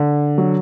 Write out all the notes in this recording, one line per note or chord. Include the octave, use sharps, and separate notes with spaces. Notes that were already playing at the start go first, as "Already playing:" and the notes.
Already playing: D3
F#3